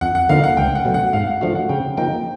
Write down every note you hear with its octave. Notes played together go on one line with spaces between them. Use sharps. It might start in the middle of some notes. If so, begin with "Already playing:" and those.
F2 F#5
F#5
D3 F3 A#3 D#4 F5
F#5
C#2 G5
F#5
B2 F#3 A3
F#5
G#2 F5
F#5
F3 A3 D4 F#4 F5
F#5
C#3 G5
F3 A#3 D#4 G5